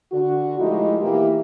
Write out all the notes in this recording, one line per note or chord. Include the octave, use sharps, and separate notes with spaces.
D3 F#4
F3 G#3 A3 D#4 E4 G4
B2 E3 A#3 E4 G4